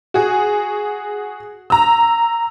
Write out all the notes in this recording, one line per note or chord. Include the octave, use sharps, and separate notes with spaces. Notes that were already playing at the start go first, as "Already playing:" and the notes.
F#4 G#4
A#5 E6